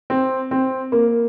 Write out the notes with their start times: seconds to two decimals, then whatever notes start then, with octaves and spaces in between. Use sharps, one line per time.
0.10 C4
0.51 C4
0.92 A#3